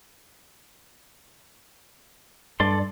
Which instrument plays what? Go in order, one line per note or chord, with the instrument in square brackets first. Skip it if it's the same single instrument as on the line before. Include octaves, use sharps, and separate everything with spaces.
[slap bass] G2 [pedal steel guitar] A4 D5 C6